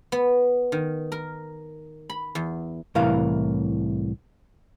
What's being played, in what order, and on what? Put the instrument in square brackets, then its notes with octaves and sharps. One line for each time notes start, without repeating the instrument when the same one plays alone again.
[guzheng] B3
D#3
A#4
B5
E2
[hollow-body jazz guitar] C2 A2 E3 A#4 F5